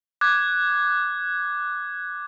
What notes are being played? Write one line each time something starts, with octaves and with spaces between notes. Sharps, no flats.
D6 F#6 G#6